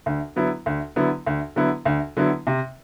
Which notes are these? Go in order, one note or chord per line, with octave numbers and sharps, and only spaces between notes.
D2
D3 F#3 B3 E4
D2
D3 F#3 B3 E4
D2
D3 F#3 B3 E4
D2
D3 F#3 B3 E4
C3